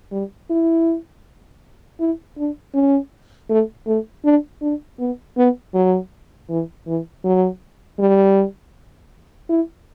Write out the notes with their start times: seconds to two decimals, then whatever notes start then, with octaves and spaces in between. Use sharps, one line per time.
0.12 G3
0.50 E4
2.00 E4
2.38 D4
2.74 C#4
3.50 A3
3.87 A3
4.25 D4
4.62 D4
4.99 B3
5.38 B3
5.74 F#3
6.49 E3
6.87 E3
7.24 F#3
7.99 G3
9.49 E4